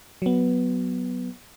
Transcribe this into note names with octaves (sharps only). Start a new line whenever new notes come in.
F#3 B3